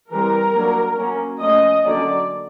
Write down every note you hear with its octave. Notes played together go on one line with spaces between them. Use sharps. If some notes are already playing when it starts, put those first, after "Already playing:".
E3 G3 C4 A#4
F#3 A#3 D4
F#3 A#3 C#4
F3 A3 C#4 D#5
D3 F#3 A#3 C#4 D5